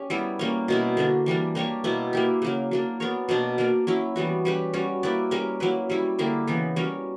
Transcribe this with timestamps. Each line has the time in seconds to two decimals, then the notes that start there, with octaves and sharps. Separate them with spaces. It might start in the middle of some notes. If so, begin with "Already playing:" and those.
Already playing: C#4 G4
0.10 G3 B3 E4 A#4
0.39 G3 A#3 C#4
0.68 B2 A#3 E4
0.97 D3 A#3 D4 F#4
1.26 E3 G3 A#3 D4
1.55 A#3 D4 G4 C#5
1.84 B2 A#3 E4 B4
2.13 A#3 E4 G4
2.42 C#3 F#3 A#3
2.71 F#3 A#3 D4
3.00 B3 D4 A#4 C#5
3.29 B2 A#3 D4
3.58 A#3 D4 A#4 D5
3.87 F#3 C#4 E4
4.16 E3 G3 B3 F#4
4.45 G3 C#4 G4 B4
4.73 G3 C#4 F#4
5.03 A#3 E4 B4 D5
5.31 G3 C#4 G4 A#4
5.60 F#3 A#3 E4 B4
5.90 G3 C#4 E4
6.19 D3 A#3 E4 G4
6.47 C#3 E3 B3
6.76 G3 C#4 F#4 A#4